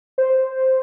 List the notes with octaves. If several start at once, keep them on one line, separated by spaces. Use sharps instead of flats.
C5